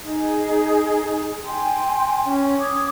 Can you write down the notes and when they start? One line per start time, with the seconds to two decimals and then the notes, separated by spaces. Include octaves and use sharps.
0.03 D#4 G#4
1.45 G5 G#5 C6
2.26 C#4
2.59 D6 D#6 G#6